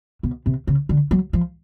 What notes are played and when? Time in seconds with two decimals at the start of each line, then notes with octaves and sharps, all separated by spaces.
0.23 B2
0.46 C3
0.67 C#3
0.89 D3
1.11 F#3
1.33 F3